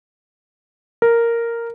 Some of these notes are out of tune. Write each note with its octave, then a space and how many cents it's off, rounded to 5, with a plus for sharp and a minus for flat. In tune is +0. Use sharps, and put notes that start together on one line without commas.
A#4 -5